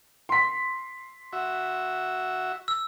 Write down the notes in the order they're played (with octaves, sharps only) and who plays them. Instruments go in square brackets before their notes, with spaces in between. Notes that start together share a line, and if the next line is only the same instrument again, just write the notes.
[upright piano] C6 B6
[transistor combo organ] F#4 E5
[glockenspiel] E6